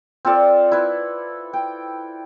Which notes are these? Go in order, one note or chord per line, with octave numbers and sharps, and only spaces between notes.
C4 F4 A4 D5
E4 B4
G5